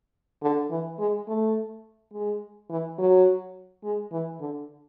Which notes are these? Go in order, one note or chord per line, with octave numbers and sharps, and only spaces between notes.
D3
E3
G#3
A3
G#3
E3
F#3
G#3
E3
D3